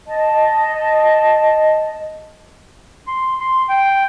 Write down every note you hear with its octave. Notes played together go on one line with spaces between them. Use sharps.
D#5 A5
C6
C6
G5